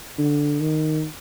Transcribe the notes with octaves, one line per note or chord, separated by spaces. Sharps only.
D3
D#3